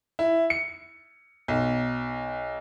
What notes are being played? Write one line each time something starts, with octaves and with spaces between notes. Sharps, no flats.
E4
C#7
B1